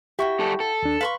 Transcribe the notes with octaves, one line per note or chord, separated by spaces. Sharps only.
E4 F#4 G4 G5 C#6
G3 A4
A4
D#2 D4
B4 F5 C6 C#6